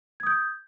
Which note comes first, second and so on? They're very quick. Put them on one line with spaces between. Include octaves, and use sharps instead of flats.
G#6 D#6 G6